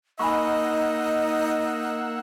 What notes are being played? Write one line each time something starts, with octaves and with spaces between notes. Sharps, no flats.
A#3 D#4 D#5 F#5 G#5 B5 C#6 E6